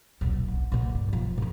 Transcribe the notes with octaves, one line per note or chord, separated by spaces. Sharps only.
D#1 B1
D3
A#2 D3
G2
E1 F3
G#2 D#4